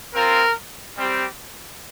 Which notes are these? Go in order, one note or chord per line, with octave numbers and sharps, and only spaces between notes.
C4 F4 A#4
G3 C4 G4